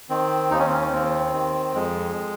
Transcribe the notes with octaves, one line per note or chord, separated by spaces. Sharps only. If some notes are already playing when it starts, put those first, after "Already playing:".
D#3 C4
D#2 D#4
C#4
C4
C#4
D#2 C4
D#3
F2 G#3